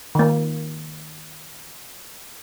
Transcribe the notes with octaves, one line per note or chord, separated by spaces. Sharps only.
D#3 A#3